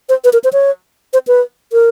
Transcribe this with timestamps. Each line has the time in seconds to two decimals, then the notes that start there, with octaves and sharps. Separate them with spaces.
0.09 C5
0.24 B4
0.33 A#4
0.44 C5
0.53 C#5
1.13 C5
1.27 B4
1.73 A#4